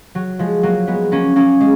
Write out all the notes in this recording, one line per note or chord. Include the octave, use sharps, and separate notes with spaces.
F#3
F3 G#3
F#3 A#3
G#3 B3
A#3 C#4
A#3 C#4
G#3